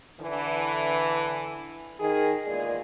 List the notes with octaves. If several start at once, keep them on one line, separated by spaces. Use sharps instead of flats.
D3 E3
D#3 G#4
E2 A#2 G#3 G#4 D5